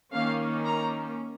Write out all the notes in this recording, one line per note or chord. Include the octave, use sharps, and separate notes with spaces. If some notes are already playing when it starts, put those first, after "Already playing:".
D#3 A#3 C#4 F5
A#5